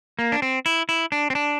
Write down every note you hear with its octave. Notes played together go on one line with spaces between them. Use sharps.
A#3
D4
C4
E4
E4
D4
C4
D4